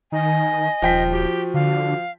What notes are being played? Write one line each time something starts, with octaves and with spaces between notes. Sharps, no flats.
D#3 D#5 G#5
D#1 F3 G5 B6
F#4 G4
D3 F5